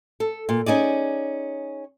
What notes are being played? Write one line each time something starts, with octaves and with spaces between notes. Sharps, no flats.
A4
A#2
C#4 D#4 G#4 D5